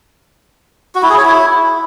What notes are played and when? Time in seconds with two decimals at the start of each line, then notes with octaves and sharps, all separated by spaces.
0.95 F#4
1.03 E4
1.10 G#4
1.18 C#5
1.25 E4